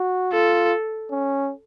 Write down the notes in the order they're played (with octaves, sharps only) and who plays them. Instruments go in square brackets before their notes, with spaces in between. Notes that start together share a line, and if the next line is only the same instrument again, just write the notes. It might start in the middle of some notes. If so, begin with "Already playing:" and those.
Already playing: [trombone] F#4
[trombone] F4 [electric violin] A4
[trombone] C#4